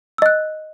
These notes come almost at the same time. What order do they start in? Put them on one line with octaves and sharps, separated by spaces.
E6 D#5 F#6